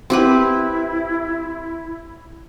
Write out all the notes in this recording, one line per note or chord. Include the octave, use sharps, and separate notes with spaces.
C4 E4 G4 B4